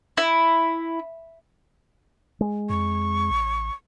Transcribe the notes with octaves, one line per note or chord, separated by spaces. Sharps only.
E4
G#3
F2 C#6
A1